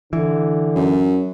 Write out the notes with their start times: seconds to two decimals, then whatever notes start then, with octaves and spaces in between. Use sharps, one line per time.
0.13 D3 E3
0.76 F#2